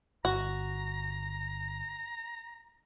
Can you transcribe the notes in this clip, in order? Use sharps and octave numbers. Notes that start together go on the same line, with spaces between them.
G1 F#4 A#5